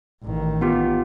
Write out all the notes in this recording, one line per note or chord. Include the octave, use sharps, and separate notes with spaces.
A1 D#3
B3 F4 G4